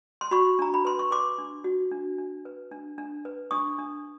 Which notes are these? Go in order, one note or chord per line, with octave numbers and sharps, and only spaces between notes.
C6
F#4 B5 C#6
D4 A#5
B5
B4 C6
C#6
B4 C6 D6
D4
F#4
D4
D4
B4
D4
D4
B4
D4 C#6 D#6
D4